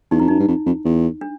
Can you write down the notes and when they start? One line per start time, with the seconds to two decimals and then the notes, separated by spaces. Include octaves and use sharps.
0.11 E2 D#4
0.20 F2 E4
0.28 F#2 D#4
0.39 G2
0.48 F2
0.66 F2
0.85 E2
1.21 D4